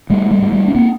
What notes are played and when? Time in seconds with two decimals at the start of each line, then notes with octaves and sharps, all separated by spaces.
0.10 G#2 G3 A3
0.31 G3 A3
0.42 G#2
0.52 G3 A3
0.68 C#4
0.75 A#3 C4